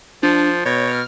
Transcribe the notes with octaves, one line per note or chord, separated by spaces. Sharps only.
F3 D4
B2 C#5
F6